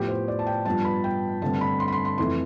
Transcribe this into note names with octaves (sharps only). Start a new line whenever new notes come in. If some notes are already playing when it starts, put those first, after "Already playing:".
Already playing: A2 F3 B3 G4
C5
D5
A5
G5
G2 F3 B3 A5
B5
G5
G2 D3 A3 C4 A5
B5
C6
B5
C6
C6
F2 E3 A3 C6